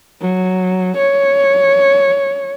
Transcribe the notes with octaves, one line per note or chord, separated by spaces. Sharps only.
F#3
C#5